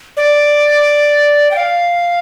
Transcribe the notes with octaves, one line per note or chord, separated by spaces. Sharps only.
D5
G5
F5